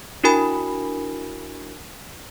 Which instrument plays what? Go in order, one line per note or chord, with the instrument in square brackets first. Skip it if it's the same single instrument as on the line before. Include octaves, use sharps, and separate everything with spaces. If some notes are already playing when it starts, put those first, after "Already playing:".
[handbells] D4 E4 F#4 A#4 G#5 B5